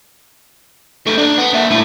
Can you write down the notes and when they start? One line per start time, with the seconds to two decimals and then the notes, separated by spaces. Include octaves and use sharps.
1.06 A3 D#4
1.18 D4
1.38 B3
1.53 A#3 E5
1.71 A3 E4